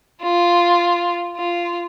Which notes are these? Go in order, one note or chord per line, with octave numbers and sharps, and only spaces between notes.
F4
F4